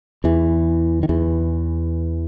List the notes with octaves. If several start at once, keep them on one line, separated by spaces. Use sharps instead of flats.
E2 E3
D#3
E2 E3